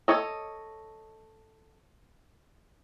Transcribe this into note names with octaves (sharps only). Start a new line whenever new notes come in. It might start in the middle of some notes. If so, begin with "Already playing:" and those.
A4 C#5 D#5